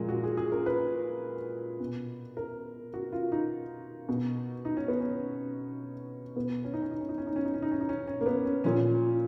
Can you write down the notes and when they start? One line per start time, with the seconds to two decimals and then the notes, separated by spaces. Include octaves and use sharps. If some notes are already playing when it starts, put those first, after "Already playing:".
Already playing: A#2 F3 G#3 A#3
0.09 F#4
0.24 G#4
0.37 G#4
0.52 A#4
0.66 B4
1.80 B2
2.37 A#4
2.94 F#4
3.12 F4
3.32 D#4
4.09 B2
4.65 D#4
4.77 C#4
4.88 B3
5.01 C#4
6.36 B2 B3
6.64 C#4
6.73 D#4
6.82 C#4
6.91 D#4
7.01 C#4
7.09 D#4
7.18 C#4
7.27 D#4
7.36 C#4
7.45 D#4
7.54 C#4
7.62 D#4
7.72 C#4
7.81 D#4
7.89 C#4
8.07 C#4
8.21 A#3
8.26 B3
8.46 C#4
8.64 A#2 F3 C#4